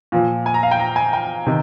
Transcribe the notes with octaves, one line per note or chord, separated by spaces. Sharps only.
A#2 F3
G#5
A#5
F5
G5
A#5
G#5
G5
C3 D#3